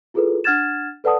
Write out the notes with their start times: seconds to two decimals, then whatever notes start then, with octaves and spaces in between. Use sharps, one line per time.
0.14 E4 F4 G#4 A4 B4
0.44 D4 F#5 F6 G#6 A6 E7
1.04 A4 B4 D5 F#5 A5 D#6